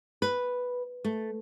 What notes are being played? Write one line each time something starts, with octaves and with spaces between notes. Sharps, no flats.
B4
A3